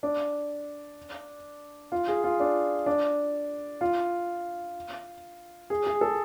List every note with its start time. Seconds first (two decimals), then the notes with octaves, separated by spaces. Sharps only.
0.03 D4
1.92 F4
2.08 G#4
2.24 F4
2.40 D4
2.86 D4
3.81 F4
5.70 G#4
5.86 G#4
6.01 A4